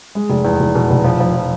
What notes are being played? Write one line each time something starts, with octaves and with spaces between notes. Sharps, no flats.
G#3
F1
E2
F1
B2
F1
F3
F3
F3